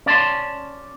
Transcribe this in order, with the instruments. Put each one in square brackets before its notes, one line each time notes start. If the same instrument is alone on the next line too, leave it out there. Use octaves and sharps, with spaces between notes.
[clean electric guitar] C#4 D5 A5 C6